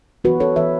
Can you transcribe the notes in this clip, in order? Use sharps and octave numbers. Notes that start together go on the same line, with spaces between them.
E3 B3 F#4 B4
A4 C#5
E3 B3 B4 E5